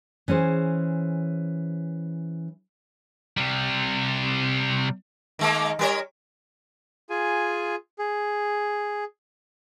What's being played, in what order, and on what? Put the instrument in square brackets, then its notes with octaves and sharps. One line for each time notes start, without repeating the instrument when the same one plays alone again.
[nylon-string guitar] E3 C#4 G#4 C5
[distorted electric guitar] C3 G3
[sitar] D#3 G#3 A#3
G3 A#4 C#5
[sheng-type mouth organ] F4 G#4 G#5
G#4